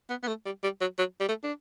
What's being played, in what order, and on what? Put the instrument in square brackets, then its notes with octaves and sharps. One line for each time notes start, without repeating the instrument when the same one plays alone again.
[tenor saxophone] B3
B3
A3
G3
G3
F#3
F#3
G3
A3
D4